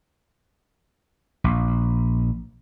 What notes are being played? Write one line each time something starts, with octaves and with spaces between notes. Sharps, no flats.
A#1